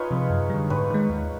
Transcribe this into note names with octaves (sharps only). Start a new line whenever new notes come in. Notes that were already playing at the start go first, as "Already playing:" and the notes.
Already playing: D#4 F4 G#4 B4 C#5
C3 F3
F#2
D3 G3
G#2 B4 C#5
D#3 G#3
D#2